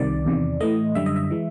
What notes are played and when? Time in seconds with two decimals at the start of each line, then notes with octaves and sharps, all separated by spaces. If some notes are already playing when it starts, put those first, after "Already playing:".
Already playing: C2 C3 D#3 D5
0.25 E2 C3 D#3
0.60 A2 E3 A3 D#5
0.95 F#2 D3 G3 E5
1.06 D#5
1.16 E5
1.31 E3 G#3